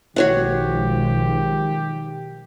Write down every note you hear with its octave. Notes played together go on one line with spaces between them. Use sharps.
B1 D#3 F3 G#3 F#4 G4 C#5 F#5